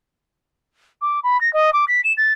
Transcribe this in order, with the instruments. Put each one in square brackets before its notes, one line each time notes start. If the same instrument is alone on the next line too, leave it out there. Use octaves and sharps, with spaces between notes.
[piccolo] D6
B5
A#6
D#5
D6
B6
E7
A6